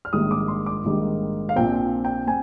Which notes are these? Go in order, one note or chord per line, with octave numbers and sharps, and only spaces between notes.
F6
A#1 G#2 D#3 G3 A#3 D#6
D6
C6
D6
A#1 G#2 D#3 G3 A#3
F5
A#1 A#2 F3 C4 G5
G5
C4 G#5